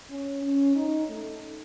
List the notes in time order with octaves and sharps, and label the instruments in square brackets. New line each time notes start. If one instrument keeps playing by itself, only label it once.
[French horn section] C#4
C#4
D#4
A3